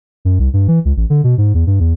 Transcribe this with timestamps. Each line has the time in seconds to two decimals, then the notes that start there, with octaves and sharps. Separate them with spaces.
0.25 F#2
0.39 C2
0.53 G2
0.68 E3
0.85 C#2
0.97 A1
1.10 D3
1.24 B2
1.38 G#2
1.54 E2
1.67 G2
1.80 E2